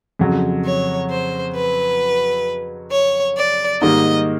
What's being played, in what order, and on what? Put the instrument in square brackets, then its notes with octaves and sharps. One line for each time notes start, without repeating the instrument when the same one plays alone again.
[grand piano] F2 C#3 F#3
[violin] C#5
C5
B4
C#5
D5
[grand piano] G#2 D#3 G3 A#3 [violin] D#5